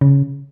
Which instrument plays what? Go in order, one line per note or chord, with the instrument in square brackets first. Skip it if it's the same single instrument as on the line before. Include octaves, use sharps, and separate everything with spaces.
[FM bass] C#3